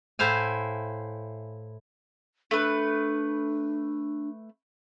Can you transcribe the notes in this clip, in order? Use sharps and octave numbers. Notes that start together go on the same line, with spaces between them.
A2 E4 C5 F5 G#5
A3 D4 B4